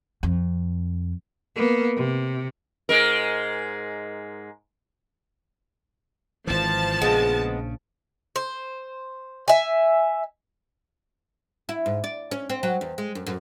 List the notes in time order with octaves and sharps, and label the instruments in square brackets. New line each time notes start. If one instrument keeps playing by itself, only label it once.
[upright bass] F2
[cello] A#3 B3
C3
[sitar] G#2 G#3 A#4
[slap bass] G#1 E3 [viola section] F3 A5
[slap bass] A#1 C#3 [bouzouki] G#3 B3
[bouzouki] C5
E5 G#5
[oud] E4
G#2
D5
C#4
C4
F#3
E2
G#3
F#2
F#2